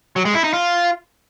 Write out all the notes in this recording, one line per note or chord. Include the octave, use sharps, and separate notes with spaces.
F#3
G#3
E4
D#4
F4